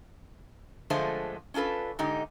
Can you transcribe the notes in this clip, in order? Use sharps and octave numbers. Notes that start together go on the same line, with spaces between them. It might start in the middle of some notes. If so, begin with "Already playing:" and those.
D3 F3 G#3 A3 F4 C5
C#4 D4 F4 A4 B4
G#2 D3 D#4 G4